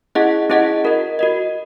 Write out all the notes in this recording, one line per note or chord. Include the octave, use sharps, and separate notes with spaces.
C#4 E4 G#4 D#5 F#5
C#4 E4 G#4 D#5 F#5
F#4 A#4 D#5
F#4 A#4 D#5